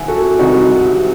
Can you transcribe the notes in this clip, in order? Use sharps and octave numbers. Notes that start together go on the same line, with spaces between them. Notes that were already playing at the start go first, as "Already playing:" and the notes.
Already playing: C2 C3 D#3 E5 F#5 G#5
F#4 A4
C2 C3 D#3 D#4 F#4